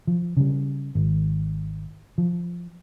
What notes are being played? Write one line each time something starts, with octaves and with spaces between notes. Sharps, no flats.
F3
C#3 G3
G#1
F3